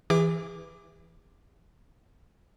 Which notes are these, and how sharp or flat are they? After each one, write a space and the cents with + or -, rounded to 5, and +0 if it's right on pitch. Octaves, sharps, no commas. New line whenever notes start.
E3 +0 G#4 -40 D6 +0